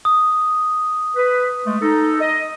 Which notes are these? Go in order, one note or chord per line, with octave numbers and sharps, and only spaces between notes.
D#6
B4
G#3 A3
D#4 A4
D#5